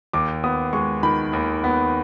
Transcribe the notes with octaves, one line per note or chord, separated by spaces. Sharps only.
D#2 D6
B3 D#6
G#3 C#6
D#3 B5
D#2
B3